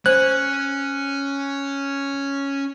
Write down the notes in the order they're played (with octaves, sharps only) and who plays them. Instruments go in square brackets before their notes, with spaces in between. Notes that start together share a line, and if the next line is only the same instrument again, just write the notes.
[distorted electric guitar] C#4 [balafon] C5 [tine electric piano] F#6